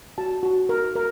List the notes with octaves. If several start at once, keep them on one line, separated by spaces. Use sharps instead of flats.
F#4 A5
F#4
A#4
A#4